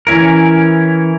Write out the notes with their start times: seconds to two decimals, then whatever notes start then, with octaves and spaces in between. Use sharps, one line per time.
0.07 E3 C#4 E4 A#4